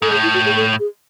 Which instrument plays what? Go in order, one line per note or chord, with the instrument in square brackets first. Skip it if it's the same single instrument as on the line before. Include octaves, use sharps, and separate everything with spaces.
[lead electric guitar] G#2 [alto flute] A4
[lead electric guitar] A2 [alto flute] G#4
[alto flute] E4
F#4
G#4
A4
G#4